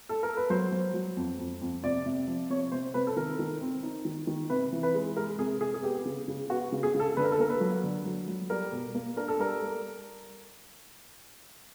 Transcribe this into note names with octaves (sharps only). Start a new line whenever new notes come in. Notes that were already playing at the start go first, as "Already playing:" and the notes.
A4
A#4
B4
F#3 C5
F#3
F#3
F2
F2
F2
C3 D5
C3
F3
C3 C#5
C3 C5
C3 B4
A4
D#3 A#4
D#3
C4
D#4
D#3
D#3
C3 B4
E3
B4
G#3
G#3 A#4
C3 G#4
C3 G#4
G#4
B3 G4
C#3
C#3
B3 F#4
C#3
G#4
C#3
A4
D3 B4
A#4
A4
A#3 A#4
B4
F#3
D3
F#3
F#3
G3 A#4
B2
A#3
D4 A#4
A4
G3 A#4
G3